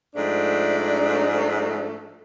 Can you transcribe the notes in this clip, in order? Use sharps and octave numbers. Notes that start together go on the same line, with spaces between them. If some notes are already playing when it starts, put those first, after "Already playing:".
G#2 F3 A3 D4